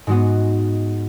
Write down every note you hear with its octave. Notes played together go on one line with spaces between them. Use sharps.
G#2 G#3 B3 F#4